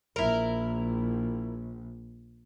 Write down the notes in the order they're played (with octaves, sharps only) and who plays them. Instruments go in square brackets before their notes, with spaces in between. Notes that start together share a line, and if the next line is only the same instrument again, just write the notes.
[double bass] A#1 [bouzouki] E4 A#4